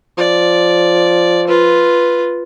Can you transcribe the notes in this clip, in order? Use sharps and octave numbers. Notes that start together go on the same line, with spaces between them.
F3 D5
F4 B4